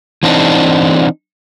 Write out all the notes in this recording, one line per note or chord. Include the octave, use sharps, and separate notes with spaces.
E3 C4 D4 D#4